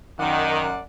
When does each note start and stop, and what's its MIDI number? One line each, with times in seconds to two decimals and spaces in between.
0.19 0.81 42
0.19 0.66 51
0.19 0.81 74
0.19 0.81 78